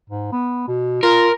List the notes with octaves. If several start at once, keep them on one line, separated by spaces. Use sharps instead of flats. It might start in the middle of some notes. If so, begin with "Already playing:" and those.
G#2
B3
B2
F4 A#4